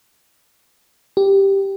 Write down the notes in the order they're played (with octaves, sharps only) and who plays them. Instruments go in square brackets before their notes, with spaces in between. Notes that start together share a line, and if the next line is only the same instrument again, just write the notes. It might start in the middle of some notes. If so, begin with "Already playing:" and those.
[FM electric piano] G4